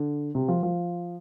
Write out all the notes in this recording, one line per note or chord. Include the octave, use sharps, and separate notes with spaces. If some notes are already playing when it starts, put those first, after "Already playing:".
Already playing: D3
C3
F3
F3